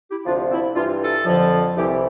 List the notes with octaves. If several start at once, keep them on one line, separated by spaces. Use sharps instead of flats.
E4 G4
D2 C3 F3 D4 F4
C4 E4
G2 E3 D4 F4
F4 A4
F2 D3 F3
C2 C3 E3 E4 G4